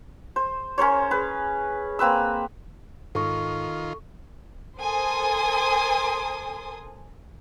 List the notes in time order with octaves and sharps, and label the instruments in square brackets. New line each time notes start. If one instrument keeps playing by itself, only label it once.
[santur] C5
C#4 A#4 C5 C#5
G#4 B4
A#3 C4 B4 E6
[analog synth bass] G#2 [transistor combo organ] D#3 F4 [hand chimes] A4 C#6
[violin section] A4 A#4 C5 G#5 C6 D#6